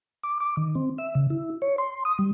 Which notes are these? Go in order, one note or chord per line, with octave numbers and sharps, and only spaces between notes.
D6
D6
D#3
C4
E5
C#3
E4
C#5
C6
D#6
G3